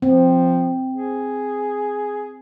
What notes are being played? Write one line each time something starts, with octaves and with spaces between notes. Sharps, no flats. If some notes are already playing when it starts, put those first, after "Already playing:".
F3 C4
G#4